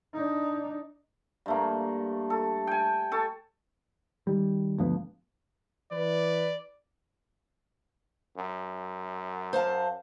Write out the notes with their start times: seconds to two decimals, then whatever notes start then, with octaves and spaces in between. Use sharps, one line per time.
0.14 D4 D#4
1.46 G2 A3 A#3
2.30 A4
2.67 G5 G#5
3.12 A4 A5 C#6
4.27 D#3 G3
4.78 D2 G2 F3 B3
5.92 E3 B4 D5
8.37 F#2
9.53 C5 F5 A5